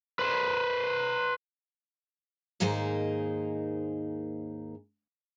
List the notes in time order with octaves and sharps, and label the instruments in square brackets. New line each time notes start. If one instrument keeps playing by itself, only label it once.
[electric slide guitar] B4 C5
[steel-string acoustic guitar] D#2 G#2 A#3 D#4 G#4 C5